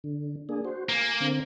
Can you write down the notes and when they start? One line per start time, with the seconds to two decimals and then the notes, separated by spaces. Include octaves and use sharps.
0.04 D3
0.49 A#3 D4 G#4
0.65 F#4 C5
0.89 A#3 G#5
1.20 D3 C4